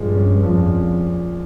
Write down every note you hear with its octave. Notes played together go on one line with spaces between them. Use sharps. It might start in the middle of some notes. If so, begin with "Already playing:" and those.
Already playing: G2 A#2 F3 G#3
C#4
F2 F3